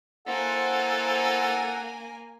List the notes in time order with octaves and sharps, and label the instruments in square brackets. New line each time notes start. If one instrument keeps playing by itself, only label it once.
[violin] A#3 G#5 [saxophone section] E4 C5 [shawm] A4 [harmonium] F#5